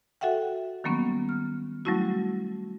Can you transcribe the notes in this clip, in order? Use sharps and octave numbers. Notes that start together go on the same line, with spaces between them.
F#4 A4 E5 F#5 G5
D#3 F#3 G3 A#3 B3 C#4
F6
F#3 G3 A3 C#4 E4 F#4